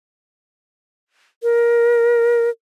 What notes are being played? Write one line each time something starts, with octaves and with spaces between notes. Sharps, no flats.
A#4